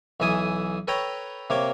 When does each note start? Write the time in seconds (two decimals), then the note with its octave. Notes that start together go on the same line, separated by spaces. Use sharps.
0.20 B1 E3 A4 E5 G#5 D#6
0.88 A4 B4 C#5 G5 A#5 C#6
1.50 C3 A#3 C#5 D6